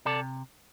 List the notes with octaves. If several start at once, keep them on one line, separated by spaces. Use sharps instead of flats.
C3 A4 D5